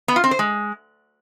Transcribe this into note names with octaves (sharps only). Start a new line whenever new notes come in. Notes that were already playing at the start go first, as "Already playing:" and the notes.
B3
F4
C4
C5
G#3